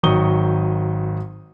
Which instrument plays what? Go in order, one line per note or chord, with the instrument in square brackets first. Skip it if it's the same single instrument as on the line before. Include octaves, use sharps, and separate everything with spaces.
[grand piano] G#1 D#3 F#3 C#6 D#6 G7